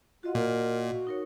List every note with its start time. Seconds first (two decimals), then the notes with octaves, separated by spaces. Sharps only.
0.23 F4 F#4 D#5 F#5
0.35 A#2 A#4
0.89 F#4
1.07 D#4 A#4 C#5